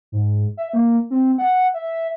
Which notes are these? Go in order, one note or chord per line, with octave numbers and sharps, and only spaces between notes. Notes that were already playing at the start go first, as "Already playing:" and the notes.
G#2
E5
A#3
C4
F#5
E5